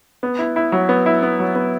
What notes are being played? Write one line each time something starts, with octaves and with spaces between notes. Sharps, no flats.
B3
E4
E4
F#3
B3
E4
B3
F#3
B3